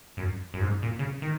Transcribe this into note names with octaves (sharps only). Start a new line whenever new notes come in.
F#2
F#2
G#2
A#2
C#3
D#3